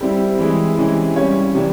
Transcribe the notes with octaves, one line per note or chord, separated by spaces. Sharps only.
G3 C4 E4 G4
E3 G#3 E4 G#4
C3 E3 G#3 C#4 E4
G3 C#4 G4 C#5
C3 E3 G3